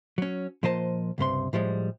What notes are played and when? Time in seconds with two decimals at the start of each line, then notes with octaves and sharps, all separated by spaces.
0.18 F#3 C#4
0.63 A#2 F3 A#4 C5 D#5 A5
1.18 C#2 G2 C3 C6
1.53 A2 F3 G3 G#3